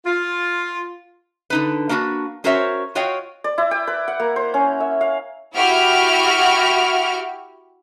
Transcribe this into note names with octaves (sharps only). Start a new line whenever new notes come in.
F4
D3 D#4 B4
A#3 D4 F#4 A#4 B4
C#4 F#4 A#4 C5 C#5 E5
F4 F#4 C#5 D#5 F5 G5
D5
E4
G5
B4
F#5
A#3
C5
C#4
E5
F5
E4 F#4 G4 E5 F6 D7